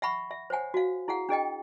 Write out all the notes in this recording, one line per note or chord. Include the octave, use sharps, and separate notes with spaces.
E5 F#5 B5 C#6
E5
C5 C#5 F#5 G#5
F#4 F5
E4 G#4 F5 F#5
D4 G#4 D#5 G5